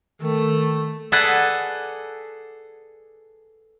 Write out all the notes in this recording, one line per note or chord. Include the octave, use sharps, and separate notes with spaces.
D#3 A3
G#4 A4 B4 D5 F#5